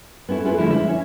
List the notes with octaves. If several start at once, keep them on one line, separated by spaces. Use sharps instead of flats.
B3 C#4 E4 A4
E4 F4 G#4 A4 B4
D3 F3 G#3 A3 D4 E4
E4 C#5 E5
C#4 C#5